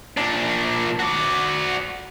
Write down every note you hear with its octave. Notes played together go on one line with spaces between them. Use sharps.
A#2 D4
F#4 D5